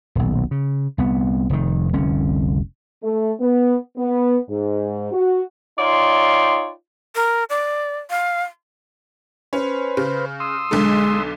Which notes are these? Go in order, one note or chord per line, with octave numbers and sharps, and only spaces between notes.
D#1 B1
C#3
C2 B3
F1 D#3
F1 C2 D3 C#4
A3
B3
B3
G#2
F#4
D#4 F4 C#5 D5 G5 C6
A#4
D5
F5
C#4 B4 C5
C#3
C6 D#6 E6
B1 D3 G#3 A4